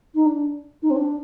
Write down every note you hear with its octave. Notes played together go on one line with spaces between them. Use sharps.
D#4
D4
D#4
C4
D4